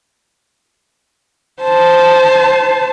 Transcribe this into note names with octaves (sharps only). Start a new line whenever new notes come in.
C5 A5